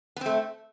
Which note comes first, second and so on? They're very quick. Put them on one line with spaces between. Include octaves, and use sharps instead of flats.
B3 C4 A3